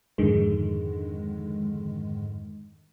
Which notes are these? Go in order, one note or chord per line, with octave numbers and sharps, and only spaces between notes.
F2 G#2 D3 D#3 G#3